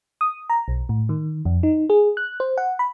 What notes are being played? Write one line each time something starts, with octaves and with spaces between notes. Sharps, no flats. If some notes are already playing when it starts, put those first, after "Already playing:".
D#6
A#5
B1
A2
D#3
F2
D#4
G#4
F#6
C5
F#5
B5